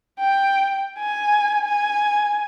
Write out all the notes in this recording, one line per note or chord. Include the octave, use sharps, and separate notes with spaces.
G5
G#5
G#5